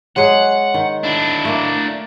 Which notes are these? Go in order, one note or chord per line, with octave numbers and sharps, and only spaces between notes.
F#3 G#3 G#4 F#5
D#3
D4 E4
A3 A#3